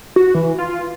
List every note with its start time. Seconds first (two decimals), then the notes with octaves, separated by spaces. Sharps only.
0.16 F#4
0.35 E3
0.58 F4